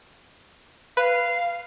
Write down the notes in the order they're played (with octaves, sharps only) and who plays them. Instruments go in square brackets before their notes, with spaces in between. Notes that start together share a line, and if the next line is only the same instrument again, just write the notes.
[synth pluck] B4 [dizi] F5